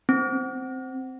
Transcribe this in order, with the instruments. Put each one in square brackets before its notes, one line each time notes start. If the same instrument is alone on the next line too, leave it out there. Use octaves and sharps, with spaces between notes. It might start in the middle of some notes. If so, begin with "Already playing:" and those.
[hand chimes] C4